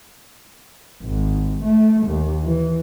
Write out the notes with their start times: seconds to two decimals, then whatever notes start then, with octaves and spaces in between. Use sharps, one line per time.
1.03 G#1
1.64 A3
2.07 D#2
2.44 E3